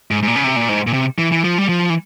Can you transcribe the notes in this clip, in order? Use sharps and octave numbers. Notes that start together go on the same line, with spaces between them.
G#2
G#2
A#2
C#3
C3
A#2
G#2
A#2
C3
E3
E3
F3
G3
F3
E3